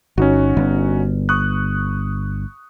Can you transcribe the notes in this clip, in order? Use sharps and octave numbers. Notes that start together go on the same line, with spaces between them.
G1 C#4 D#4 F#4
G1
C#6 D#6 F#6